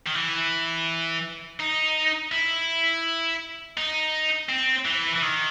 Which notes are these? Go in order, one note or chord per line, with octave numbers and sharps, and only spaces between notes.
D#3
E3
D#4
E4
D#4
C4
E3
E3
D#3